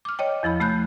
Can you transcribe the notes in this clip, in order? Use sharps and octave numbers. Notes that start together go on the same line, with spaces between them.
D6 F6
C#5 D#5 G5
E2 F3 E4 B5
C3 A3 B5 F#6 G6